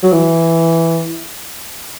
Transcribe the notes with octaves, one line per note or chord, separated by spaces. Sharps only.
F#3
E3